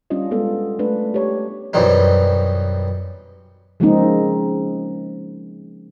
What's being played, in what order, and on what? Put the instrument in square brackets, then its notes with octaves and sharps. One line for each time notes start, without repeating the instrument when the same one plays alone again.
[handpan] G3 C#4 D4 F4 D#5
G#3 B3 F4 A4
A3 D4 B4
G4 C#5
[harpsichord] F#2 B2 E3 G3 C4 D#4
[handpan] C#3 F3 G#3 A#3 C4 D#4